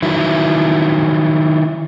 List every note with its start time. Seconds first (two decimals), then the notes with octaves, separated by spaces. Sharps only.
0.02 D#3 F#3 E4